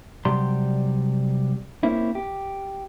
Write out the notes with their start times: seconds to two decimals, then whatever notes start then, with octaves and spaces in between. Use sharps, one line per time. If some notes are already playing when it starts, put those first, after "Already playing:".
0.25 C3 F#3 G3 G4 D5 C6
1.83 A#3 C4 C#4 E4
2.15 G4